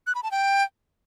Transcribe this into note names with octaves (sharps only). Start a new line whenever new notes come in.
F#6
B5
A5
G5